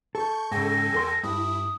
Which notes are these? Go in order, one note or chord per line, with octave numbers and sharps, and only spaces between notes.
A4 C#6 G6
G#2 C#3 A4 G5 G#5 A#6
E2 A#4 C6
G2 E4 D#6